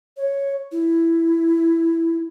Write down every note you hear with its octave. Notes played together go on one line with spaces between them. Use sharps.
C#5
E4